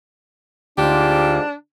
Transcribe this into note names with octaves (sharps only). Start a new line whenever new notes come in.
D2 G#2 D4 F4 G4